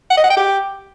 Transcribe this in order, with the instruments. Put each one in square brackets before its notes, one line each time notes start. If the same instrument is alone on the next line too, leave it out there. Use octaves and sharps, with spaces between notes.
[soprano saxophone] F#5
D#5
F#5
G5
G4